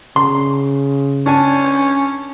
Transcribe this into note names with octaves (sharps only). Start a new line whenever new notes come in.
C#3 C6
C#4 D4 G#5